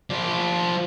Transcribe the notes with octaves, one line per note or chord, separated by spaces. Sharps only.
F3 D5